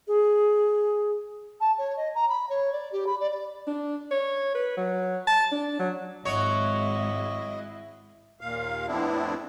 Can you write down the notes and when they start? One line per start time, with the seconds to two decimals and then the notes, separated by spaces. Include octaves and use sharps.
0.08 G#4
1.60 A5
1.78 C#5
1.97 D#5
2.15 A#5
2.29 B5
2.49 C#5
2.73 D5
2.92 G4
3.07 B5
3.20 D5
3.32 D5
3.67 D4
4.11 C#5
4.55 B4
4.77 F#3
5.27 A5
5.52 D4
5.79 F#3
6.25 G#1 F#3 G#3 E4 C#5 D#5
8.41 D#2 A#2 F5
8.87 F2 A2 B3 C4 D4 E4